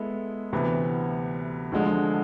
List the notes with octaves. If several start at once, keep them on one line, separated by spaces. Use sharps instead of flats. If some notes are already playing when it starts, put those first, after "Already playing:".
Already playing: G#3 B3 E4 A4
D2 C3 E3 B3
D2 D3 F3 G#3